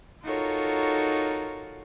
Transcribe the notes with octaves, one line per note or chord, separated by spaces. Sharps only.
D#4 F4 F#4 A4 A#4 C#5